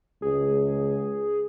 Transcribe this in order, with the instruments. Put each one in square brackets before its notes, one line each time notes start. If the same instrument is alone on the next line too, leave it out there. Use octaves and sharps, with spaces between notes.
[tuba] C#2 [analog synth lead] G#4